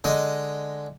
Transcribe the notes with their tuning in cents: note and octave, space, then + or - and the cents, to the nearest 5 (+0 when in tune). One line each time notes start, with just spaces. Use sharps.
D3 +0 G#3 +0 D#5 +0